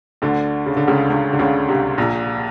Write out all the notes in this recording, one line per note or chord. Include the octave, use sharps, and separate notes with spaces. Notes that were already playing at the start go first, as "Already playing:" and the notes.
D2 D3
C#3
D3
C#2 C#3
C#2 C#3
D3
C#2 C#3
C2 C3
A#1 A#2